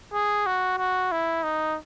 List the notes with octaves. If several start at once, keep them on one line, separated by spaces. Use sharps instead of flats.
G#4
F#4
F#4
E4
D#4